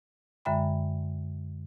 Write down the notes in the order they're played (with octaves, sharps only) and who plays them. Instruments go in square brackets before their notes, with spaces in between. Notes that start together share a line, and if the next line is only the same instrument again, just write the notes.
[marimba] F#2 D3 G#3 E5 G5 B5